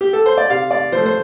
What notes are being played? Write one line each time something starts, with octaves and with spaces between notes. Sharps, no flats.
G4
A4
C5
D5
C3 F5
D5
F3 A3 C5
C5